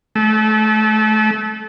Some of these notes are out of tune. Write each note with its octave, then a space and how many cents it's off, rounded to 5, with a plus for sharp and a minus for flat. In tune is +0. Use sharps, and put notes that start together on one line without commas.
A3 -30